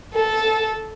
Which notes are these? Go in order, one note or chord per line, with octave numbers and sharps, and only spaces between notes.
A4